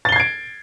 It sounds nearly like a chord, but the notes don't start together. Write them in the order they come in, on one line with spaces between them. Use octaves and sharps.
A6 G7 C7 G#6 D7